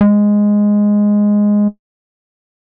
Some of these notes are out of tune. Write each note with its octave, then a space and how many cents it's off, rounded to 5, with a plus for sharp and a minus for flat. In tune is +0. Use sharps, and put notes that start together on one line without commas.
G#3 -5